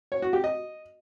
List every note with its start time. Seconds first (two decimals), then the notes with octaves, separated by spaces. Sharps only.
0.12 C#5
0.22 F#4
0.33 G4
0.44 D#5